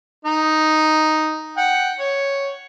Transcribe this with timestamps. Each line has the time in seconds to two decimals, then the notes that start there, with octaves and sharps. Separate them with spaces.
0.25 D#4
1.57 F#5 G5
1.99 C#5